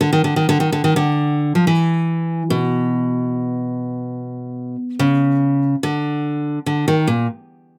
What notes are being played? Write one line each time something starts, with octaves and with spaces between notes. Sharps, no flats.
D3
D#3
D3
D#3
D3
D#3
D3
D#3
D3
F3
E3
B2
C#3
D3
D3
D#3
A#2